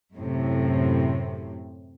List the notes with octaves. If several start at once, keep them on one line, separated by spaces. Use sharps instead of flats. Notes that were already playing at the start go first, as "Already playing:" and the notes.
F#2 A2 C3